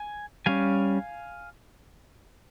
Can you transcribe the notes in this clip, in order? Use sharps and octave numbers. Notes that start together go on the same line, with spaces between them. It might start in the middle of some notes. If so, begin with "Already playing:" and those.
Already playing: G#5
G3 C#4 F5 G#5